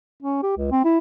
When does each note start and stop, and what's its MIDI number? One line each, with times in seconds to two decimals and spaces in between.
0.23 0.41 61
0.43 0.57 67
0.57 0.67 37
0.71 0.83 60
0.85 0.98 64